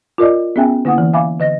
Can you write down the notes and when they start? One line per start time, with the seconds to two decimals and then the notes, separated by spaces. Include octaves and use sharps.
0.18 F4 A#4 D5 D#5
0.56 B3 C#4 G#4 E5 G5 G#5
0.85 D3 A#3 E4 F#5 D#6
0.98 E3
1.13 E5 F5 G#5 B5 D6
1.39 D3 D#5 A#6